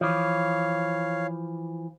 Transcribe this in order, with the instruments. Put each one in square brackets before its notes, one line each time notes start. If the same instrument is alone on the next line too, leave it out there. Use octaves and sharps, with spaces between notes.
[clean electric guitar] E3 F3 [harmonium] C#5 F5